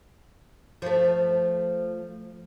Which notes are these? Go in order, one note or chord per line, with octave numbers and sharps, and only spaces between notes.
F3 A3